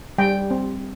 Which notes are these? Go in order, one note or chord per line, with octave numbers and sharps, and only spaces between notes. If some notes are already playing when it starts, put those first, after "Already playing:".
G3 G5
C4